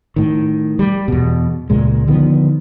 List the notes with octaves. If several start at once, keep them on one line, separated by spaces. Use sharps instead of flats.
A2 D#3
G3
E2 B2
C#2 A#2 G#3
D3 D#3 F3 B3